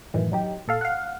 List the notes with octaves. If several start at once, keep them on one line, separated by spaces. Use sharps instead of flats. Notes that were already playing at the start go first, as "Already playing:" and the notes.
F#2 A2 D#3 E3
F#3 D#4 G4
A#2 A4 F5
F5 F#5